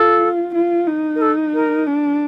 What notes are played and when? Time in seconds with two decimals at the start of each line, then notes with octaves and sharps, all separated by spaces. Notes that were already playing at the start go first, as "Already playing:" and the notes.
Already playing: F4 A4
0.55 F4
0.88 D#4
1.15 A#4
1.21 A4
1.54 A#4
1.87 D4